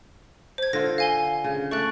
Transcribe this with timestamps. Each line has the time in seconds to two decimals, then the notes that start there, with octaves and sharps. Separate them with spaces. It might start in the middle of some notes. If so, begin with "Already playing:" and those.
0.58 C5 G#6
0.73 D3 F4 A#6
0.98 F5 G#5 G7
1.44 C#3
1.71 A3 D5 C#6 F#6